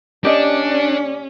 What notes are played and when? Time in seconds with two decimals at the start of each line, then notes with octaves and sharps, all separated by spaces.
0.25 D#2 C#4 D4 G4 D5 D#5